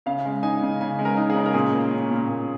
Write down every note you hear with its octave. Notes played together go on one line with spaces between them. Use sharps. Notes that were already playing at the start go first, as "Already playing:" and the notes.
C#3 F5
G#3
D#4 G#5
C#3
C#3 G#5
G#3
A#4
D#4
G#4
C#3
A#4
A#2 G#4
A#3
C#4
A#2
A#2